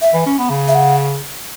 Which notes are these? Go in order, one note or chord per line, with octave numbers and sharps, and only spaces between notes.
E5
E3
C#4
B3
C#3
E5
F#5